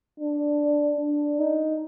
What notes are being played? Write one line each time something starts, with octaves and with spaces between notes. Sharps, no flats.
D4
D4
D#4